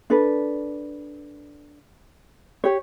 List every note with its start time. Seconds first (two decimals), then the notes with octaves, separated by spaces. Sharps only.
0.10 D4 A4 B4
2.64 G4 C#5